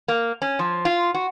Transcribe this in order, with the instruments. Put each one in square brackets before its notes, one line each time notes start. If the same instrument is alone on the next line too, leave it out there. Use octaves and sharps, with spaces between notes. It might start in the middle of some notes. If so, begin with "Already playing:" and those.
[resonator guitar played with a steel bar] A#3
C#4
F3
F4
F#4